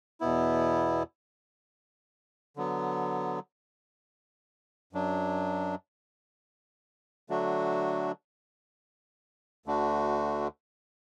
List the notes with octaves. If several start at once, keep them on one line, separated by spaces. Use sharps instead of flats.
E2 B2 B3 E4
D3 F#3 B3
F#2 F#3 D4
D3 F#3 A3 D4 F#4
D2 D3 A3 D4 F#4